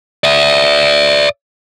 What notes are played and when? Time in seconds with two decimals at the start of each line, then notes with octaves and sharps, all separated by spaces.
0.24 D5 E5